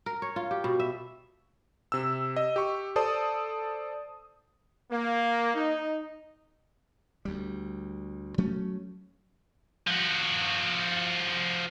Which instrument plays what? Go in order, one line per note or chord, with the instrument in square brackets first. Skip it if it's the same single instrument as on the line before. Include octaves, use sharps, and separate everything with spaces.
[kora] A#4
C#5
F4
G4
B2
E5
[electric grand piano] C3 E6
D#5
G4 C#6
A4 C5 D5 A5 D#6
[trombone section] A#3
D#4
[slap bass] D2 G3
F#3 A3 C#4
[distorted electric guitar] F3 F#4